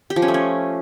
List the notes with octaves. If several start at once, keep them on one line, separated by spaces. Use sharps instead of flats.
G4
F3
C#4
A3
C#4